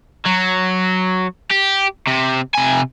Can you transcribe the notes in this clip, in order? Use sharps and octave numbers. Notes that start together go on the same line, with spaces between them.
F#3
G4
C3
C3 G#5